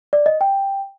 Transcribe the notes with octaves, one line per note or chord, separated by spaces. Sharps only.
D5
D#5
G5